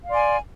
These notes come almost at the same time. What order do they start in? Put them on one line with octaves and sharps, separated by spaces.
F5 D5 C6 G#5